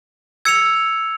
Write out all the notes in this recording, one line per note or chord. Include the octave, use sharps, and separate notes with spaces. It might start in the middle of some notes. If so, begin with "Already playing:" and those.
E6 G#6 C#7 F7